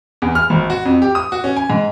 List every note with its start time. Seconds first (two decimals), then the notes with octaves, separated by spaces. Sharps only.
0.22 E2
0.35 F6
0.50 G#1
0.70 F#4
0.85 F2
1.02 G4
1.15 D#6
1.32 F#4
1.44 C#4
1.56 G#5
1.70 G#2